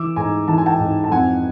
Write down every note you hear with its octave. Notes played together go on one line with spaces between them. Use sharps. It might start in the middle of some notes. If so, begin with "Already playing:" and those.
Already playing: E3 D6 E6
G#2 G#5 A#5
E3 A5
G#5
G5 A5
G#2
A5
F2 F#5 G#5